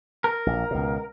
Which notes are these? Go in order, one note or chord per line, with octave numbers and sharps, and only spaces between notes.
A#4
A#1
C#2 B2